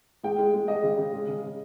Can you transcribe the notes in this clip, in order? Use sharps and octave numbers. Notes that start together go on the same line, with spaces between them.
G#3 G5
G#3
G#3
G#3 D#5
C#3
C#3
G#3
C#3
C#3